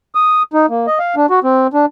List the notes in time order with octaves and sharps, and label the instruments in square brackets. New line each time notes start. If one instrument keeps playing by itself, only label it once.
[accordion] D#6
D#4
A#3
D#5
F5
D4
F#4
C4
D4